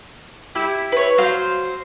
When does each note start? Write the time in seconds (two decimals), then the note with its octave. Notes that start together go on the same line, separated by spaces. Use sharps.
0.55 E4 G4
0.92 B4 C#5
1.18 F#3 C5 F5 C6